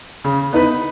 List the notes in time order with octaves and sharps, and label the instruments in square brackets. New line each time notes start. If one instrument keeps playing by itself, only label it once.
[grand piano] C#3
B3 D#4 B4